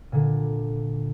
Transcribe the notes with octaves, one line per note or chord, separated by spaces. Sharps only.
A#2 D3